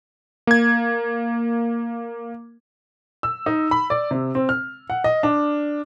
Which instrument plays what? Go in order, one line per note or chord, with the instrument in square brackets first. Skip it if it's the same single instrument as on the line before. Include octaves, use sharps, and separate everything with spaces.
[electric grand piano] A#3 G#6
[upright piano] E6
D#4
B5
D5
C3
C4
F6
F#5
D#5
D4